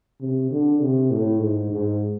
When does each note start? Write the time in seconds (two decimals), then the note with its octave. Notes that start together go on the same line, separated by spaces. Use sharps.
0.21 C3
0.51 D3
0.81 C3
1.11 A2
1.41 G#2
1.71 G#2